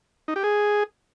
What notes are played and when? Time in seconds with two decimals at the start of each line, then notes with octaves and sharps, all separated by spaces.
0.28 D#4
0.36 G4
0.44 G#4